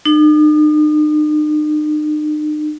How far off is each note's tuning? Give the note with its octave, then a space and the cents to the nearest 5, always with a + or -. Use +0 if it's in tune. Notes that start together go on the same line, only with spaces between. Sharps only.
D#4 -45